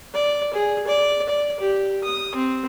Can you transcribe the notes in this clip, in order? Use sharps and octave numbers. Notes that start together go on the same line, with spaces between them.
D5
G#4
D5
D5
G4
D#6
C4